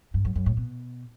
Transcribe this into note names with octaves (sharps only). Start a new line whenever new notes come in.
G2
F#2
F#2
A2
B2